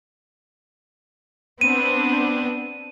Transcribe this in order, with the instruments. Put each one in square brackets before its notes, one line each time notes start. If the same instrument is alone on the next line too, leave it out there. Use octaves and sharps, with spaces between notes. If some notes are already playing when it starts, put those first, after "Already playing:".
[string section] B3 C4 D4 [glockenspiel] D#7